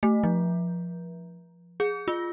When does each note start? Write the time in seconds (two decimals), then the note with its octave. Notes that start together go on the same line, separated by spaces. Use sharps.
0.03 A3
0.23 F3
1.80 G#4
2.08 F4